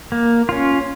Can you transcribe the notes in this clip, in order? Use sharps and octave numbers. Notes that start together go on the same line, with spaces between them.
A#3
C#4 F4